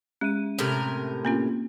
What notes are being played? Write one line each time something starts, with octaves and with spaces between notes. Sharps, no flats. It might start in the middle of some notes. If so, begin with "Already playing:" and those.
G#3 C#4 E5 D#7
A2 C3 A#4
A#3 C4 C#4 F4